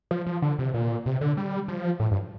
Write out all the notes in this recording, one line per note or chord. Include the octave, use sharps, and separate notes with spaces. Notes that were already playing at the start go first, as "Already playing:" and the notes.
F3
F3
D3
C3
A#2
C3
D3
G3
F3
A2
G2